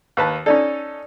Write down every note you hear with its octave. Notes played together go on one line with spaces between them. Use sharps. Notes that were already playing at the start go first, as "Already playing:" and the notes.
D#2 B4 A5
C#4 D#4 A4 D5